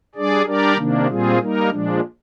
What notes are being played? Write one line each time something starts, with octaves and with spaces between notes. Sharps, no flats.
G3 D4 G#4 D5
G3 D4 G4 A#4 D5
C3 D#3 A#3 D4
A#2 G3 C4 F4 G#4
G3 A#3 D#4 A#4
A#2 F3 G#3 D4